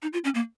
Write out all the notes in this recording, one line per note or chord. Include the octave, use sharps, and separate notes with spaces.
D#4
F4
C#4
A#3